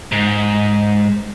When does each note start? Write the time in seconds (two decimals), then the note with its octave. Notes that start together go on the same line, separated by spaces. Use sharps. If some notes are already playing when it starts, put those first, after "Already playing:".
0.12 G#2